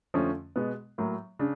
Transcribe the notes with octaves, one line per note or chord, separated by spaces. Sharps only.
F2 D3 F3 A3 C#4
B2 G#3 B3
A2 F#3 A#3
C#3 D4